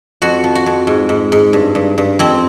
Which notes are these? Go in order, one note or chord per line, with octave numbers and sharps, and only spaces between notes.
F2 F#4
F3
F#4
F2
G#2
G#2
G#2
G2
G2
G2
F2 C4